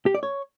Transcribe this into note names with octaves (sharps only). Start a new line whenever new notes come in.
G4
D5
C#5